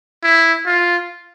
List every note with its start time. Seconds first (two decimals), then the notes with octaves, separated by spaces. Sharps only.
0.23 E4
0.66 F4